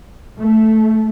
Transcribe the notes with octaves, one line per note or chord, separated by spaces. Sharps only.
A3